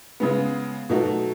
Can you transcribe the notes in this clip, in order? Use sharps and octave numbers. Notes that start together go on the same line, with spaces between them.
C#3 G#3 B3
B2 F#3 A3 D#4 F#4